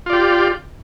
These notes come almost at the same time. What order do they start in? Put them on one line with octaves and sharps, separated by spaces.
F4 D5 G4